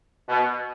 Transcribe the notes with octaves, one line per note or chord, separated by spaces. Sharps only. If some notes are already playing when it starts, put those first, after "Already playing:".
B2